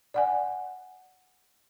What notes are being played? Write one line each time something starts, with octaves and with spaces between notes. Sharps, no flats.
D5 F#5 G#5